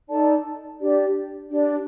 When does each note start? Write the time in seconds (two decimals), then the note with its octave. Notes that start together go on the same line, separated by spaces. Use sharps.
0.09 D#4 A4 D5 A5
0.80 D4 G4 D5
1.50 D4 G4 D5